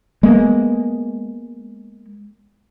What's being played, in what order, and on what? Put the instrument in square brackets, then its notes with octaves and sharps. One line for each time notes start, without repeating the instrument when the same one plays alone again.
[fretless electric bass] G#3 A#3 B3